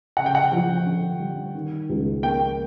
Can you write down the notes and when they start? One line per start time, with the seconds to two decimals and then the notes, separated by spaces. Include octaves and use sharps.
0.17 C#3 F#5
0.26 G5
0.35 F#5
0.51 F3
0.86 D3
1.19 G3
1.54 D#3
1.89 C#2
2.23 A#3 G5